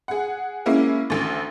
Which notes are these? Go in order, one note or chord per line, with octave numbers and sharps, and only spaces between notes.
G#4 F#5
G#3 A#3 C#4 E4
A1 D2